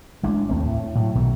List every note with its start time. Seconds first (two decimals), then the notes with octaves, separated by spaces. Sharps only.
0.23 A1 G#3 D4
0.49 D#2 A3 C4
0.65 A2
0.95 A2 F#3
1.15 B1 B2 D#3 A3